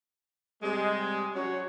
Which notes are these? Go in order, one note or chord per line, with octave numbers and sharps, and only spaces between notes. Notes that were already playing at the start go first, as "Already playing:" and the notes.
C3 G3 G#3
F#3 C#4 F#4 C#5